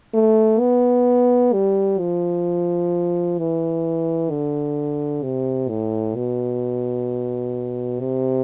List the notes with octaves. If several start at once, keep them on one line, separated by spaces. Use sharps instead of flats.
A3
B3
G3
F3
E3
D3
C3
A2
B2
C3